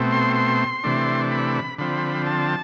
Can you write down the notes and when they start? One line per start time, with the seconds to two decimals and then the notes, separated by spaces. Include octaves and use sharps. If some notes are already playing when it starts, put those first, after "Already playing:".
Already playing: B2 A3 C4
0.12 C6
0.36 C6
0.84 C3 E3 A3 D4
1.32 B5
1.78 D3 F3 C4 B5
2.27 A5